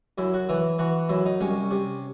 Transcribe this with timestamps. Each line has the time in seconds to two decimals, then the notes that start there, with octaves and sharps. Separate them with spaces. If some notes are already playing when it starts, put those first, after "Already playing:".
0.18 F#2 E4
0.34 F#4
0.49 E3 E4
0.79 E3 F#4
1.09 F#2 E4
1.25 D#4
1.40 C2 C#4
1.71 C3